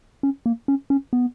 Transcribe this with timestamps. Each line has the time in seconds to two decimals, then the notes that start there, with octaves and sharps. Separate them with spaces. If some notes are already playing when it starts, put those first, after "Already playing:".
0.23 C#4
0.46 A#3
0.68 C#4
0.90 C#4
1.13 B3